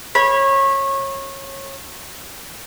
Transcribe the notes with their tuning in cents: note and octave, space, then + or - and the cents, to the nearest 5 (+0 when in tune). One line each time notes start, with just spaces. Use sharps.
C#5 -25 B5 -15